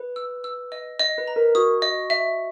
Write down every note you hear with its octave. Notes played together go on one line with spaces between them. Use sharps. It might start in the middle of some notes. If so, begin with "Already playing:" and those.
Already playing: B4
E6
E6
D#5
D#5
B4
A#5
A#4
F#4 D#6
D#5
E5